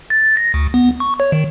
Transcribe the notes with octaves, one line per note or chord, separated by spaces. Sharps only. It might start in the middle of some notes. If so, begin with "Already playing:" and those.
A6
A#6
D2
B3
C#6
C#5
D#3